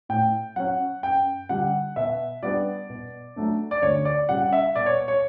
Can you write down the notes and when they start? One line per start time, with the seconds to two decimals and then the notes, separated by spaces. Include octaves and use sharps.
0.09 A2 G5
0.56 F#3 C#4 F#5
1.03 F#2 G5
1.49 D3 G3 D4 F#5
1.96 B2 E5
2.43 G3 B3 D4 D5
2.90 B2
3.36 F#3 A3 D4
3.71 D5
3.82 D2 C#5
4.05 D5
4.29 C#3 G3 F#5
4.53 E5
4.75 B2 D5
4.86 C#5
5.08 C#5